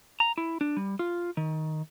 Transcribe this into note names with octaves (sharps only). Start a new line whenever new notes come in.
A#5
E4
D4
G3
F4
D#3